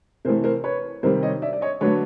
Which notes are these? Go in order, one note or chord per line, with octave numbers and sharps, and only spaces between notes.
C3 E3 A3 A#4 C5
A#4 C5
B4 C#5
C3 D#3 G3 A#4 C5
C#5 D#5
D5 E5
D5
C#5 D#5
D3 F#3 A3 B4 C#5